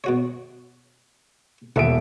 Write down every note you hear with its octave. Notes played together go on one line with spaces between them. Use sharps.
B2 F#4 C#5
E1 A1 D#2 E5 F#5 D7